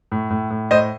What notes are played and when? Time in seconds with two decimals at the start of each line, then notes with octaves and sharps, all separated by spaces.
0.12 A2
0.30 A2
0.50 A2
0.71 A2 C5 D#5